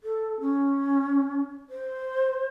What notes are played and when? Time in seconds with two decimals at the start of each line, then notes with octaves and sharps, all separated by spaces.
0.03 A4
0.41 C#4
1.70 C5